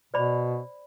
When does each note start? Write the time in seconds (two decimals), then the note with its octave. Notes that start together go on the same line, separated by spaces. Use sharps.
0.14 B2 C5 D5 B5